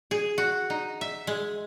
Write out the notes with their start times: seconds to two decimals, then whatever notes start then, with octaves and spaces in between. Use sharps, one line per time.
0.11 G#4
0.38 F#4
0.70 D#4
1.01 E5
1.27 G#3